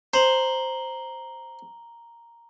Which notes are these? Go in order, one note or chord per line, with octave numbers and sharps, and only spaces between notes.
C5 A#5 F#7 G7